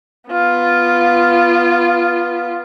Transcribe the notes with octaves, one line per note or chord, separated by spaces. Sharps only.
B3 F4